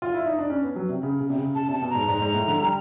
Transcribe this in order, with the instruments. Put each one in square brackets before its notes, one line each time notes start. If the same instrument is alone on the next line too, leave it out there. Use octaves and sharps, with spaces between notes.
[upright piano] F4
E4
D#4
D4
C#4
B3
F#3
C3
C#3
C#3
C3
C#3
[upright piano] C#3 [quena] A5
[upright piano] C3 [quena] A5
[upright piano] B2
[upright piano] G#2 [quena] A#5
[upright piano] G#2 [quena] A#5
[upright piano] G#2
A2
D3
G3